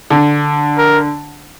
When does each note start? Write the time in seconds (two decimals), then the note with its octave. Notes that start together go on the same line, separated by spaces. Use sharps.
0.10 D3
0.78 A#4